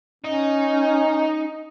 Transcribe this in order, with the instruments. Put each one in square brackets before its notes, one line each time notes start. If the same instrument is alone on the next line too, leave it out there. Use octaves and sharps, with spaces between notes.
[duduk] C#4 [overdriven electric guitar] D#4